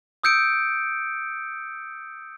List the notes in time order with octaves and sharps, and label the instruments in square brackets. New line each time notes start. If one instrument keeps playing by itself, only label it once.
[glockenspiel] D#6 E6 G6 C#7 D7